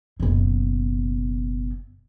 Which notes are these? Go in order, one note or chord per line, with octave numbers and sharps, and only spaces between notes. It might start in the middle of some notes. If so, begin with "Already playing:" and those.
F#1 B2